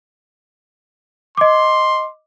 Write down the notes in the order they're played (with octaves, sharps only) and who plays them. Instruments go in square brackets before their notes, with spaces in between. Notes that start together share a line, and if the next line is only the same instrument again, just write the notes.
[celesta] D#5 D6 [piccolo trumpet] C6